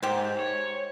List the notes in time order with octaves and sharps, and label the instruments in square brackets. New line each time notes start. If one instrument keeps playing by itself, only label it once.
[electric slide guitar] G#2 [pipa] G4 C5
[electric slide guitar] C#5